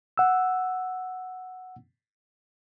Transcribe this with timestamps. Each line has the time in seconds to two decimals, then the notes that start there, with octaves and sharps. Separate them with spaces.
0.18 F#5 E6